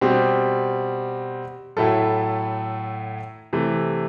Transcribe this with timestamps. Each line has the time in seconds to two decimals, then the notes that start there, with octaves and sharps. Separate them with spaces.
0.01 B2 G3 C4 G4
1.77 A2 F#3 A3 E4 A4
3.53 C3 E3 A3